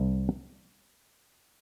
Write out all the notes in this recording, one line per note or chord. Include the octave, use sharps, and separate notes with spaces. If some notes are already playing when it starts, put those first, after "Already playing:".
Already playing: C2